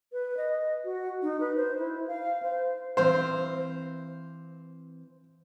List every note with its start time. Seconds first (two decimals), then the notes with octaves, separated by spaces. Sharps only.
0.13 B4
0.37 D#5
0.84 F#4
1.22 D#4
1.40 B4
1.56 C5
1.79 E4
2.08 F5
2.43 C5
2.97 E3 C4 C5 F5